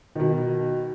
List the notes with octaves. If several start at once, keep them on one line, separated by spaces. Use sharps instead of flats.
B2 D#3